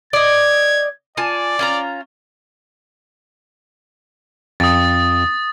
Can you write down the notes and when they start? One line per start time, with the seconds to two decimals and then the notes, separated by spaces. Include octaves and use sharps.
0.13 D5 D#5 G#6
1.17 F4 D5 G#5 A5
1.59 C#4 F4 A#5
4.60 F2 D#6 A6